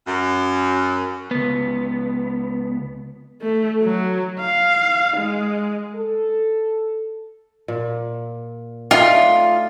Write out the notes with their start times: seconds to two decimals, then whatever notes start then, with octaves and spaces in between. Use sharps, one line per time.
0.07 F#2
1.31 C#2 B3
3.42 A3
3.83 F#3
4.40 F5
5.17 G#3
5.94 A4
7.68 A#2
8.91 A3 D4 D#4 F4